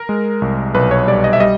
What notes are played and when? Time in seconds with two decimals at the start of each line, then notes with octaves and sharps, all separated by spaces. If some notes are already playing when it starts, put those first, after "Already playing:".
Already playing: A#4
0.09 G#3
0.42 C2
0.74 B1 B4
0.91 C#5
1.07 G3 D5
1.24 D#5
1.33 E5
1.40 G3 D#5